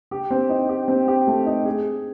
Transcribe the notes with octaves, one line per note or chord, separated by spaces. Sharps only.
G4
C4
D#4
G4
C4
G4
A3
D#4
G#4